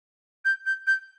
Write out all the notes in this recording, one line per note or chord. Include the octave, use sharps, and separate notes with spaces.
G6
G6
G6